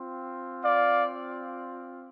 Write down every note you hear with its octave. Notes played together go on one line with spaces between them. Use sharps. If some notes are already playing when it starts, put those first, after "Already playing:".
Already playing: C4 F4
D5 F5